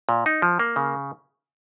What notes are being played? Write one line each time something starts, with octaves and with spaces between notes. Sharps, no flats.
A#2
D#4
F3
A#3
C#3